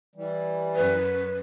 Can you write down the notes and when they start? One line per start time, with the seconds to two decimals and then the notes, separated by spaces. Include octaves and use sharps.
0.15 E3 G3
0.76 F#2 B4